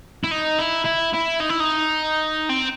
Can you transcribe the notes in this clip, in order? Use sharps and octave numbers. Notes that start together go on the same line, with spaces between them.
E4
D#4
E4
E4
E4
D#4
E4
D#4
C4